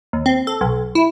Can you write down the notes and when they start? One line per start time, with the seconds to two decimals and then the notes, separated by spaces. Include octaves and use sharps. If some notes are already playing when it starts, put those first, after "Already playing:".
0.13 D#2
0.26 C4
0.47 A4
0.61 B1
0.95 E4